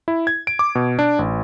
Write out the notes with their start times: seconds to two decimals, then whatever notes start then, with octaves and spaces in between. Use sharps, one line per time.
0.08 E4
0.27 G#6
0.47 D7
0.59 D6
0.75 B2
0.99 D4
1.19 A1